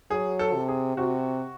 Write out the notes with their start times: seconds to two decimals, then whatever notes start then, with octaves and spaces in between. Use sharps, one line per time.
0.10 F#3 G#4
0.39 A4
0.54 C3
0.68 G#4
0.97 C3 F#4